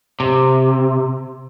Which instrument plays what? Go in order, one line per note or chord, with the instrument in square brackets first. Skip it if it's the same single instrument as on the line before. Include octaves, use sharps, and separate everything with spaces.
[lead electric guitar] C3